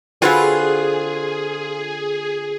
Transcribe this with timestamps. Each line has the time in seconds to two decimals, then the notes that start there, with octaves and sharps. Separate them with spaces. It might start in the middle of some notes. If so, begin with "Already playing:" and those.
0.22 D3 C4 F4 F#4 G#4 B4 G#5